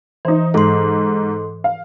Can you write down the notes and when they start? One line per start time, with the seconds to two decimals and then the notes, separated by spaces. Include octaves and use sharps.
0.25 E3 D#4 C5
0.54 G#2 A4 C6
1.64 F5